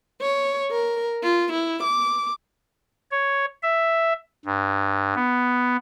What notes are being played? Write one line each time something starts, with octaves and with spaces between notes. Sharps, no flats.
C#5
A#4
F4
E4
D6
C#5
E5
G2
B3